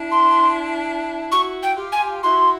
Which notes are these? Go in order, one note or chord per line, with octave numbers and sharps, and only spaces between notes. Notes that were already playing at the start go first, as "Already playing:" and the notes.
Already playing: D4 E4
C6
E4 F#4 C#6
G5
F4 G4
G#5
E4 F#4 C6